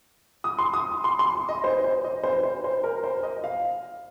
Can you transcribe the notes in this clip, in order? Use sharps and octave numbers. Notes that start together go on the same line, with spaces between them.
D#6
C6
D#6
C6
C6
D#5
C5
C5
D#5
C5
C5
C5
A#4
C5
D#5
F5